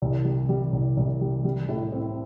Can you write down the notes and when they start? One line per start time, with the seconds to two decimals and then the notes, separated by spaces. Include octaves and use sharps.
0.02 C2
0.25 G3
0.49 G3
0.73 C2
0.97 C2
1.21 G3
1.44 G3
1.69 A2
1.92 C4